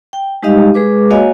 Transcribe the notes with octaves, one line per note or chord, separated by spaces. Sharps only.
G5
G3 G#3 D#4 G4 D#5 F5
G#3 G#4 B4 D6
A#3 F#4 C#5 D#5 F5 G#5